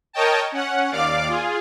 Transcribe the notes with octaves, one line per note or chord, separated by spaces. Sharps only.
A#4 C#5 D#5 G5 A5
C#4 F#5
D#2 D5 F5 D6
F4 G#4